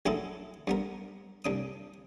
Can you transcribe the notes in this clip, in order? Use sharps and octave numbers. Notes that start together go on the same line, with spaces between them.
A#1 F#2 F#3 E4 G#4 A4
G2 B3 A#4
C2 D4 D#6